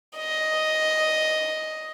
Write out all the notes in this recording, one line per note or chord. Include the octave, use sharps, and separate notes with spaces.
D#5